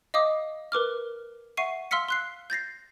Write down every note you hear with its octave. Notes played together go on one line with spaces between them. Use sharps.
D#5 F5 D6 D#6
A#4 B4 D6 F6
E5 F#5 C#6 C7 D#7
F5 C6 E6 F6 B6 C#7
C6 F#6 C7
G6 A6 A#6 C7